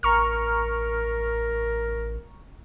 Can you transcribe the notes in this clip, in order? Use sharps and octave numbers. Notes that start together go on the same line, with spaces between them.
A1 A#4 A#5 C#6 F6